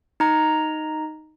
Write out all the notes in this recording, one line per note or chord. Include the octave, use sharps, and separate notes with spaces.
D#4 A#5